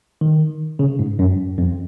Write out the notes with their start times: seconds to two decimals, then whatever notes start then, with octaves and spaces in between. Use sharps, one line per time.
0.21 D#3
0.79 C#3
0.99 G#2
1.19 F#2
1.58 F2